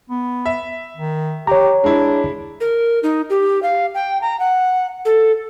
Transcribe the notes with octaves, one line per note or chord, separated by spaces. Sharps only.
B3
E5
D#3
G4 C#5 A#5
G#3 D4 E4
A#4
D#4
G4
F5
G5
A#5
F#5
A4